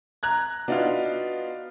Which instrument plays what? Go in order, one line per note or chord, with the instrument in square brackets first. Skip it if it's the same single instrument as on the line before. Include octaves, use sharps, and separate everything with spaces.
[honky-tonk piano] A#5 F#6 G#6
[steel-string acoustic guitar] B3 F#4 B4 [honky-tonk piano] D4 D#4 F4